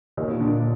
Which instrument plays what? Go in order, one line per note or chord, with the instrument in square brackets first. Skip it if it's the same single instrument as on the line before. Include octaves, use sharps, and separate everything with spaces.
[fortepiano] D#2 [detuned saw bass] A#2
[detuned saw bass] B2
A#2
[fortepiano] D3